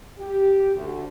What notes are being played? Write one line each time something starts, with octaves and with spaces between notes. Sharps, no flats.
G4
D2